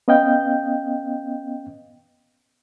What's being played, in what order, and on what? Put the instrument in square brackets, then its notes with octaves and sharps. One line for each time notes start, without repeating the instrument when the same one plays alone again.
[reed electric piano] B3 C#4 D#5 F5 G5 G6